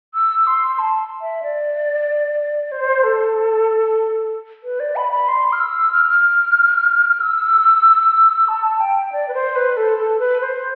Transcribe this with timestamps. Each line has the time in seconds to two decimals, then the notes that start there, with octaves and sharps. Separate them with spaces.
0.15 E6
0.47 C6
0.79 A5
1.21 E5
1.43 D5
2.72 C5
3.04 A4
4.64 B4
4.80 D5
4.96 B5
5.12 B5
5.28 C6
5.52 F6
5.60 E6
5.92 F6
6.09 F6
7.20 E6
8.48 A5
8.80 G5
9.13 D5
9.28 B4
9.34 C5
9.56 B4
9.77 A4
9.98 A4
10.20 B4
10.41 C5